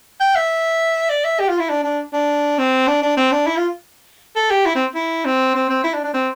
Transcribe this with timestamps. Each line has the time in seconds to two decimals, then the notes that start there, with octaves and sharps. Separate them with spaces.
0.20 G5
0.35 E5
1.10 D5
1.24 E5
1.40 G4
1.49 F4
1.59 E4
1.69 D4
1.84 D4
2.13 D4
2.58 C4
2.87 D4
3.03 D4
3.17 C4
3.32 D4
3.47 E4
3.57 F4
4.36 A4
4.51 G4
4.65 E4
4.75 C4
4.95 E4
5.25 C4
5.55 C4
5.69 C4
5.84 E4
5.94 D4
6.04 D4
6.14 C4